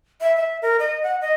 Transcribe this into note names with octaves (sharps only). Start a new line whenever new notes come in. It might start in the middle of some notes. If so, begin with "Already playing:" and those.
E5
E5
A#4
D#5
F#5
D#5